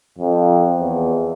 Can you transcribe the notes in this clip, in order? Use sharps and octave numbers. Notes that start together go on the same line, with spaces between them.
F2
E2